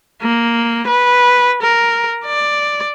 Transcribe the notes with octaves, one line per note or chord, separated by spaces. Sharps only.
A#3
B4
A#4
D5